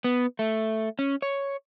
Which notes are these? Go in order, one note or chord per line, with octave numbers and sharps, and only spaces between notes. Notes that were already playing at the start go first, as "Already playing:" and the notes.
B3
A3
C#4
C#5